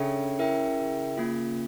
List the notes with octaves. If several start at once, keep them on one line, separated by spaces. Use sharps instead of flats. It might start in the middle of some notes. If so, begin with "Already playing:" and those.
Already playing: C#3 D4 A4 E5 G5
E4 A#4 E5 G5
A#3 C#4 F4